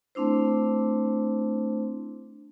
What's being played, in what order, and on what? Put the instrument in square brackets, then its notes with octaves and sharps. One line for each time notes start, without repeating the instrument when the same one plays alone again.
[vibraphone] A3 C4 D4 E4 C5